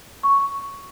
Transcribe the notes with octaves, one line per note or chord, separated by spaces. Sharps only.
C#6